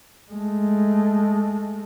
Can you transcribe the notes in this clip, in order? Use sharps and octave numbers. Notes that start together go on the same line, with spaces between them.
G#3 A3